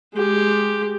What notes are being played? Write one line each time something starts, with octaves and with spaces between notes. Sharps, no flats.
G#3 G4